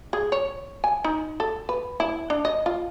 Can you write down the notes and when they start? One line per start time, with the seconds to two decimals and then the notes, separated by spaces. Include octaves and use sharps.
0.13 G#4
0.32 C#5
0.84 G#5
1.04 D#4
1.40 A4
1.69 B4
2.00 E4
2.30 D4
2.45 D#5
2.66 F4